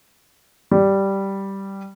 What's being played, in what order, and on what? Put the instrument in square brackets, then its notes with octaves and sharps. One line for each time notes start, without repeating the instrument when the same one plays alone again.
[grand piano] G3